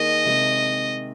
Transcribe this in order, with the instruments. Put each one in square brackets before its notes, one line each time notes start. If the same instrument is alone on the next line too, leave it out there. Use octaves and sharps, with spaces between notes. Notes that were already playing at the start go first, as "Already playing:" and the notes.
Already playing: [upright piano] D#3 A#3 G#4 [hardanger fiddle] D#5
[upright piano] C3 D#3 G#3